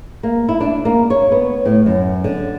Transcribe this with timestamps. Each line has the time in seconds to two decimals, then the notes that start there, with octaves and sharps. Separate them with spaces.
0.23 A#3
0.49 E4
0.60 D4
0.85 A#3
1.10 C#5
1.32 B3
1.65 A2
1.86 F#2
2.24 D3